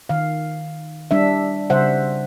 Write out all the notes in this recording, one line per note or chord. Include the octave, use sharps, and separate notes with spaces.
D#3 F5
G3 D4 E5
C#3 G3 C5 E5 F#5